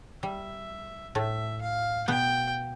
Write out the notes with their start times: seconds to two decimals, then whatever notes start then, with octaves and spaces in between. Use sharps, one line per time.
0.23 G3 E5
1.15 A2 A3 E5
1.61 F5
2.08 B2 B3 G5